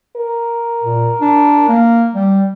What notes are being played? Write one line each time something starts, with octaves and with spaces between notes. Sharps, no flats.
A#4
A#2
D4
A#3
G3